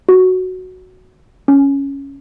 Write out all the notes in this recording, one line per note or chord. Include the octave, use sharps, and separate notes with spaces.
F#4
C#4